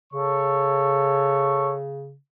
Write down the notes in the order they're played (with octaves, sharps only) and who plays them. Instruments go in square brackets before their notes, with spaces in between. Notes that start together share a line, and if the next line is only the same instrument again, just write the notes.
[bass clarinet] C#3 [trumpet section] A4 C#5 C#6